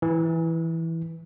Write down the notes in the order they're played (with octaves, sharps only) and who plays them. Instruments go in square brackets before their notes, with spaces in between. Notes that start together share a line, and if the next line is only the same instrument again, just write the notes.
[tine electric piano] E3